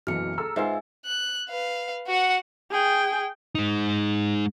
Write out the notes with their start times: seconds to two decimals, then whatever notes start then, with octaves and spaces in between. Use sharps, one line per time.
0.07 F#1 B1 E3 F#3 F6 C#7
0.38 G#4 A4 A#5 E6
0.56 G#2 F4 B4 C5 E5 G#5
1.05 F#6
1.49 B4 F5
2.06 F#4 F#5
2.71 G#4 G5
3.55 G#3 D#4